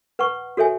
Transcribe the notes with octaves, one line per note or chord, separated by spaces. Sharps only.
B4 F#5 C#6
F#4 A4 C#5 E5 G#5